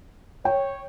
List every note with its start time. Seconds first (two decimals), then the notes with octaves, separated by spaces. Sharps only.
0.45 C#5 G5